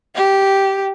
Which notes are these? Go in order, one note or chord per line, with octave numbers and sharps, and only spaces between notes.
G4